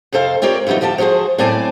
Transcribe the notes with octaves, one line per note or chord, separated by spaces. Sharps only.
F2 C3 A4 C5 F5
C4 F4 G4 A#4 C#5 D5
C#3 E3 F#3 G3 D#4
D2 F3 G4 D#5 A5
F3 G3 F#4 G#4 C5
A2 F#3 C4 D5 G#5 A5